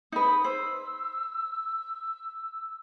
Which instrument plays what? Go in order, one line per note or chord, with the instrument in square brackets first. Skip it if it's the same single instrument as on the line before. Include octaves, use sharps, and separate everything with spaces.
[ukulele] D#4 B4 [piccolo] D#6
[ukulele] C5 [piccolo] E6